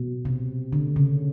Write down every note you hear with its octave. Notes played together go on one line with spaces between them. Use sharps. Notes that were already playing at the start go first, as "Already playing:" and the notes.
Already playing: B2
C3
D3
C#3